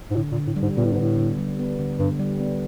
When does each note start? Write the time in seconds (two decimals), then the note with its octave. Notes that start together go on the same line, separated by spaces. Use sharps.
0.11 G#2
0.16 A2 D3
0.32 A#2
0.37 D3
0.47 A2
0.56 G3
0.62 G#2
0.77 A#2 B3
0.85 A2
0.93 G#2
0.98 A2 D3
1.18 D3
1.38 G3
1.59 B3
1.79 D3
1.99 G2 D3
2.20 G3
2.40 B3